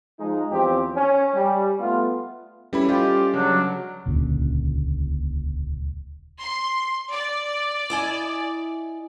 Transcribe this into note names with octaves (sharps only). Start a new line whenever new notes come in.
F3 G#3 D#4
E2 F3 C4 G4
C#4
G3
A3 B3 F4
G3 C#4 E4 A4 B4 B5
G3 F4 G4 D#5
C#3 F#3 D4
D#1 C#2 A#2 D3
C6
D5
E4 D#5 G#5